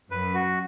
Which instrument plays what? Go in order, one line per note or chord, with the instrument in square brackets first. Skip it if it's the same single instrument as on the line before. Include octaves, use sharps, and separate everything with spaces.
[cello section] F#2 [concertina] B4
[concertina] F#4